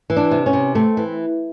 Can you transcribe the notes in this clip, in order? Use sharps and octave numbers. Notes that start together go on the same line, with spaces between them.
E3
D4
C3
C#4
C3
A3 C4
E3